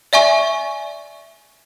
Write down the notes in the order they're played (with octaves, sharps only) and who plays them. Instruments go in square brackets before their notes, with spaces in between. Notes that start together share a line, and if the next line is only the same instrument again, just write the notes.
[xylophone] D5 E5 G#5 C#6